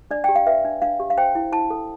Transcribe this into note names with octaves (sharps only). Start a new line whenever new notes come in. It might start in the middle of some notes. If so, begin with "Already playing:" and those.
D4 D5
G4 G5
F5
B4 E5
D4
D4 F5
G4
F5
C5 G5
E4
E4 A5
A4